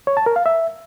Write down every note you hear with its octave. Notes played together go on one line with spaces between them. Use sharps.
C#5
A5
A#4
F5
E5